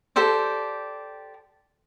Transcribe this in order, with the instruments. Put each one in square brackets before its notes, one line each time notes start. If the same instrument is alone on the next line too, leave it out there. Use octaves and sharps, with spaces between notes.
[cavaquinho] G4 A4 C5 D5